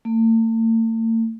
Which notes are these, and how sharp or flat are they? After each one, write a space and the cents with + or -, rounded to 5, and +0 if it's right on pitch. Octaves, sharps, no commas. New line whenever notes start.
A3 +45